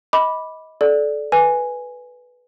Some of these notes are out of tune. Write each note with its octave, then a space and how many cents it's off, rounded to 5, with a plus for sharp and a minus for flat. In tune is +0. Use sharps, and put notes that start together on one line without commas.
D#5 +30 B5 -5 D6 +0
A4 -20 D5 +0
B4 +0 G#5 +0